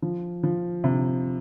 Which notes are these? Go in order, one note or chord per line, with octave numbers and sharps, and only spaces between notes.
F3
F3
C3